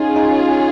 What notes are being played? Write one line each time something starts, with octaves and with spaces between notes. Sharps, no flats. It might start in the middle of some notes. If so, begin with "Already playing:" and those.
Already playing: C#4 D#4 F4 G#4
D#4